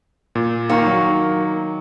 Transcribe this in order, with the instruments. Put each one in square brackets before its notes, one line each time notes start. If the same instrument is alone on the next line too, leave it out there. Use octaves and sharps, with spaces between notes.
[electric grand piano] A#2
[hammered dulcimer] D#3 D5 C#6 [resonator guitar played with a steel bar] A#3
[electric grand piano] F#3